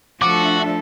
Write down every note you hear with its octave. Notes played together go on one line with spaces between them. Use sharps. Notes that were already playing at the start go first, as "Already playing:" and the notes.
F3 A3 D4 F#4 A4 E5 D6